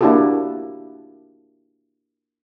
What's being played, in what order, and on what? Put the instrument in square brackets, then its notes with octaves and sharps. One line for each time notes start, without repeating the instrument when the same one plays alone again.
[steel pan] A#3 D4 E4 F#4 G4 A4